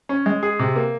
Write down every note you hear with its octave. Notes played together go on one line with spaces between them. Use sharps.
C#4
G#3
G#4
C3
A#3